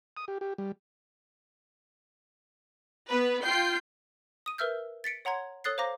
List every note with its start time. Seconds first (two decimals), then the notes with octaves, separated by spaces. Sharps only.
0.17 D#6
0.28 G4
0.41 G4
0.58 G3
3.08 B3 B4
3.42 F4 G5 G6 C7
4.46 D#6 D#7
4.58 A#4 B4 E5 E6 F6 G6
5.04 A6 B6 C#7 D7
5.25 C#5 F#5 A#5 C6 G#6
5.64 A4 C#5 D#6 F#6 A6 C7
5.78 C5 F5 A#5 D6 A#6